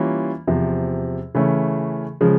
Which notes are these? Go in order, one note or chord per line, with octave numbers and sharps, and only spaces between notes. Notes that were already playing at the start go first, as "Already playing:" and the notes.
Already playing: E3 G3 A#3 C#4 F4
E2 C3 F3
C#3 E3 A3 C#4
C#3 F3 G#3